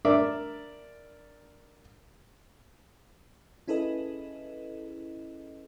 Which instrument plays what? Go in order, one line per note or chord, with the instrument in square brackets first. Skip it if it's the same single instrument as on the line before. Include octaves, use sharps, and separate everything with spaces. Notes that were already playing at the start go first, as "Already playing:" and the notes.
[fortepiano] D4 A#4 D5 E5
[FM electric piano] C#4 E4 G#4 A4 B4 D#5